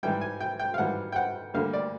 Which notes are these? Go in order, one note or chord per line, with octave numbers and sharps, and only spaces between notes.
G#2 E3 G3 G5
G#5
G5
G5
F5
G#2 E3 G3 F#5
G5
F#5
D2 D3 G3 A#3 F5
D5